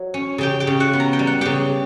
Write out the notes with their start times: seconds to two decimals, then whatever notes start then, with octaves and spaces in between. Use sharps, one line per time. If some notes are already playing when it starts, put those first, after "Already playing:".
Already playing: F#3
0.14 C#4
0.38 C#3 G4 G5
0.60 G4 G5
0.67 C#3
0.80 F#4 F#5
0.93 B3
1.00 A#5
1.13 G5
1.19 G3
1.27 F#5
1.41 C#3 G4 G5